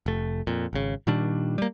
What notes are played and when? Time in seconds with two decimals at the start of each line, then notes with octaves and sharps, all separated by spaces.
0.06 F1 A3
0.47 F2 A#2
0.73 G#1 C#3
1.07 A#2 D#3 G3 D4
1.58 G3 A#3